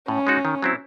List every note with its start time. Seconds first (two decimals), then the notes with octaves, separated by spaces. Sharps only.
0.08 A2 C#4
0.27 G#3 D#4 F#4
0.45 D#3
0.62 F#3 C4 E4